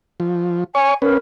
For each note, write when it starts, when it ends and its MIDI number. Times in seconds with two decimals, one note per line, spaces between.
0.20 0.64 53
0.75 0.94 73
0.75 0.91 80
0.75 0.94 85
1.02 1.18 61
1.02 1.14 70
1.02 1.18 71